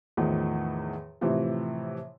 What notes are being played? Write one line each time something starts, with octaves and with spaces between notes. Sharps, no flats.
E2 A2 D#3 F3
A2 C3 E3 F3